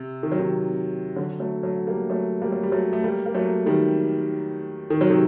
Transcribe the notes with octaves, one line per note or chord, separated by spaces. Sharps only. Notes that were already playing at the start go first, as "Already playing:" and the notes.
Already playing: C3
D#3
F#3
C3 D#3
D3 F#3
F#3 A3
F#3 A3
G3 A#3
F#3 A3
G3 A#3
F#3
G3
F#3 A3
A3
G3 A#3
A#3
F#3 A3
D#3 G3
D#3
F#3
C3 D#3